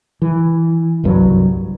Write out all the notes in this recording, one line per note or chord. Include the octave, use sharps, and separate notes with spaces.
E3
F#1 C2 G2 F#3